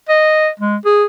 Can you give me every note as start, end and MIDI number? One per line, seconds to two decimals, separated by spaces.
0.09 0.49 75
0.60 0.77 56
0.85 1.05 68